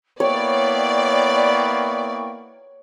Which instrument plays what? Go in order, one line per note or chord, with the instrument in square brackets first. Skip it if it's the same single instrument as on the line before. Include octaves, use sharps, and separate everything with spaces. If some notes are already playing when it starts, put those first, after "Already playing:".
[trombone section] A#3 B3 E4 [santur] C#5 [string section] D5 [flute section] G5 C#6